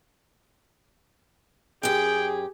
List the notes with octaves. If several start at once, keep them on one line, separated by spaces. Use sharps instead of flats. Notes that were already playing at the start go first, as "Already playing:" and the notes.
F#2 G4 G#4 G5